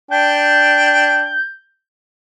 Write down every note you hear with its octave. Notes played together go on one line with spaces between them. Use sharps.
D4 G5 G6